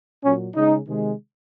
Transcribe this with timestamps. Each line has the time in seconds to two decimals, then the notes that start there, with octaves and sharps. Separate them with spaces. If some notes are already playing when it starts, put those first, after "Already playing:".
0.23 A#2 F#3 C#4
0.55 C#3 G#3 D#4
0.87 C3 D#3 G#3